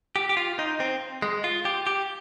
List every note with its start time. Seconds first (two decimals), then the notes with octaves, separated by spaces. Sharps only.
0.16 G4
0.29 G4
0.37 F4
0.59 D#4
0.80 C4
1.22 G#3
1.44 F4
1.65 G4
1.87 G4